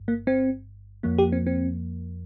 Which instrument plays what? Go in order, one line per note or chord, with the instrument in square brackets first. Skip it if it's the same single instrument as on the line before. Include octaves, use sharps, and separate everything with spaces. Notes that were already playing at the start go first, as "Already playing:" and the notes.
Already playing: [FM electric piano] G1 G2
A#3
C4
F2 F3 A#3
G4
C4
C4